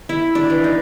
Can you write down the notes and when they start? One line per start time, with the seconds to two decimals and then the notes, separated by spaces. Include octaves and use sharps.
0.09 E4
0.35 D4
0.50 E3
0.64 D#4